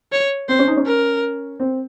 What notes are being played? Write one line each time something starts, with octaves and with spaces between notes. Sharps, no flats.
C#5
C4 C5
C#4
D#4
C#4
A#4
C4